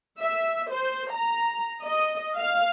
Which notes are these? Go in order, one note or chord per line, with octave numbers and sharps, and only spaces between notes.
E5
C5
A#5
D#5
F5